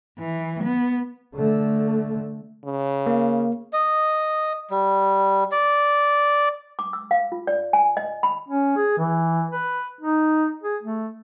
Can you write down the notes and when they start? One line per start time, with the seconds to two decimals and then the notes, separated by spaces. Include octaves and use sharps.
0.19 E3
0.63 B3
1.35 D3 A3
2.65 C#3
3.07 A#3
3.73 D#5
4.70 G3
5.52 D5
6.79 D6
6.93 E6
7.11 F5
7.32 F4
7.47 D5
7.73 G#5
7.97 D#5
8.23 B5
8.49 C#4
8.77 G#4
8.98 E3
9.51 B4
10.01 D#4
10.63 G#4
10.83 A3